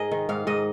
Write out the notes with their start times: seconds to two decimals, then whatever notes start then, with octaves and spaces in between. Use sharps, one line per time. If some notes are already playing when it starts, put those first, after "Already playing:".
Already playing: G#2 G#4 A#4 D#5
0.11 D#3
0.29 G#2 F5
0.47 G#2 D#5